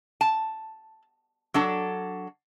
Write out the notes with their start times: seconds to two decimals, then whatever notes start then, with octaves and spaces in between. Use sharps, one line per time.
0.21 A5
1.54 F#3 D4 A4